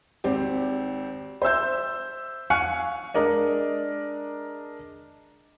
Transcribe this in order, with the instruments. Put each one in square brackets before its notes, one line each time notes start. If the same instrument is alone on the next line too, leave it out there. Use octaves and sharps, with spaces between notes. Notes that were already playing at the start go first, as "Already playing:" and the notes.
[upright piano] G#1 C4 G4
C5 E5 E6 G6
F5 G#5 C#6 F#6 C#7
[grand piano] G#3 D4 A#4 D5 D#5